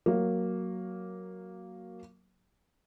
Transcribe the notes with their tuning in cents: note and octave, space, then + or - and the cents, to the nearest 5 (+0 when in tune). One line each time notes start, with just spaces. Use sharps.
F#3 +0 A#3 +0